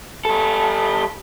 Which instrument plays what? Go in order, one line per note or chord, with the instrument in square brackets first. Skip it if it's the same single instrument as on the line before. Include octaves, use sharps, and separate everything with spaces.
[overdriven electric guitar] G3 A4